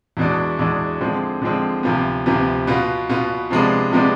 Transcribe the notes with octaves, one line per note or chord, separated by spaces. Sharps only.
E2 B2 G#3 D4
E2 B2 G#3 D4
D3 F3 G#3 C4
D3 F3 G#3 C4
D2 C3 F3 B3
D2 C3 F3 B3
B2 B3 F4
B2 B3 F4
C3 F3 G#3 B3 D4
C3 F3 G#3 B3 D4